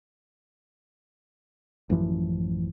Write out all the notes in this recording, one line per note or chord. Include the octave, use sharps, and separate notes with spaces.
A1 F#2 E3 F3